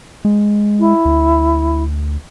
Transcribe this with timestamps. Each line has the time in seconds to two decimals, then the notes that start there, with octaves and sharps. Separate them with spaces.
0.25 G#3
0.80 E4
1.05 D2